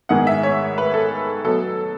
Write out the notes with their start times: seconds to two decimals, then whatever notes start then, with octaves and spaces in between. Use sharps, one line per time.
0.09 G#2 D#3 G#3 B3 F#5
0.27 E5
0.43 C#5
0.78 B4
0.94 A4
1.44 B2 F#3 B3 A4